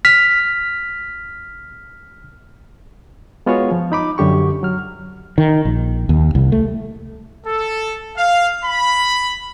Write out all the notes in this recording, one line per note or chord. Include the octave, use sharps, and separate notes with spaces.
F6 B6
G#3 B3 F4 F#4 G#4 C#5
F3
D#4 B5 D6
F#2 D3 G4 C#6
F#3 F6
D#3
A#1
D#2
C2
A3
A4
F5
B5